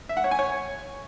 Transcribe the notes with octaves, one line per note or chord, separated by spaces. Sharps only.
E5
F#5
C#5
G#5
C#5